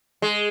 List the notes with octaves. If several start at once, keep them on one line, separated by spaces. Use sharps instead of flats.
G#3